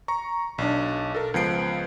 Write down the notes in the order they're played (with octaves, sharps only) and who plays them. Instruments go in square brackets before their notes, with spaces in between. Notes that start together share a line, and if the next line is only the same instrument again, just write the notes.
[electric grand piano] A#5 C#6
B1 D4
A4 A#4
C#2 F3 B3 C7 D7